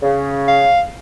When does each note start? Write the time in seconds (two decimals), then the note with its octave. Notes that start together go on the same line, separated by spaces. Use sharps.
0.03 C#3
0.48 F5